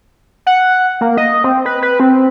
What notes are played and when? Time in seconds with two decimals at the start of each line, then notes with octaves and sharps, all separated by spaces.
0.47 F#5
1.01 A#3
1.17 D#5
1.44 C4
1.66 B4
1.82 B4
2.00 C4